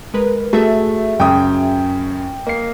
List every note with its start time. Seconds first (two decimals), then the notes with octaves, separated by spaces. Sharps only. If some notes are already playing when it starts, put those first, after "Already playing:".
0.14 G#3 A#4 B4
0.53 A3 F#4 G#4 E5
1.20 F#2 C#3 G5 D#6
2.47 A#3 D#5 C7